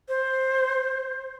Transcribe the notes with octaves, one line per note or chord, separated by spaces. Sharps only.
C5